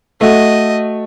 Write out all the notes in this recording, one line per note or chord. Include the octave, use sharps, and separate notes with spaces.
A3 F#4 D#5